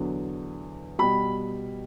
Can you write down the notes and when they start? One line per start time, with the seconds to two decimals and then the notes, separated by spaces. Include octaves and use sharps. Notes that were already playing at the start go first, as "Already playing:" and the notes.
Already playing: E2 D3 F#3
0.99 B2 G3 B5